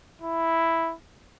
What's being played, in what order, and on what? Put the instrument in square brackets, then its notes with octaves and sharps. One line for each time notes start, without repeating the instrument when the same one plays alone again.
[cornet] E4